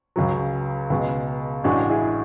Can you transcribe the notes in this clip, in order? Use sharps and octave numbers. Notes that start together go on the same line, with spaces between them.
C#2 C#3 F#3
C#2 B2 G#3
A1 A2 G#3 D4 F#4
E4 G#4